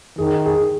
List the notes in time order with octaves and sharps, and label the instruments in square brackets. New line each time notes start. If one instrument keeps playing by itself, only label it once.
[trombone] D#3 [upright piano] G#4
[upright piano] G#4